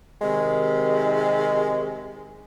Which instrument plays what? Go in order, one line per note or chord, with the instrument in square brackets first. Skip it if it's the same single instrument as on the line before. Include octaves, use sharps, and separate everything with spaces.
[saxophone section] C3 D#3 [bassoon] G#3